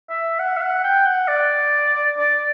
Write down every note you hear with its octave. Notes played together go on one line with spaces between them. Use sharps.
E5
F#5
E5
F#5
G5
F#5
D5
D5